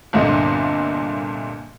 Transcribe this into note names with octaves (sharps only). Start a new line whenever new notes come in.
G1 C2 G2 A#2 D3 D#5